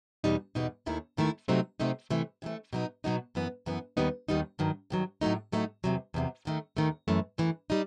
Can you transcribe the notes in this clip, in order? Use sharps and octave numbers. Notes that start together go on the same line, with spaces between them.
E2 B2 G3 D#4
E2 B2 G3 D#4
D#2 D#3 A3 E4
D#2 D#3 A3 E4
C3 F#3 A3 C4 D#4
C3 F#3 A3 C4 D#4
C3 E3 A3
C3 E3 A3
B2 F#3 B3 D#4
B2 F#3 B3 D#4
F#2 E3 B3
F#2 E3 B3
D#2 D#3 G3 B3 D#4
D#2 D#3 G3 B3 D#4
G2 D#3 F#3
G2 D#3 F#3
A2 F#3 A3 D#4
A2 F#3 A3 D#4
E2 C3 F#3
E2 C3 F#3
D#2 D#3 A3
D#2 D#3 A3
F#2 E3 A3
F#2 E3 A3
G3 D#4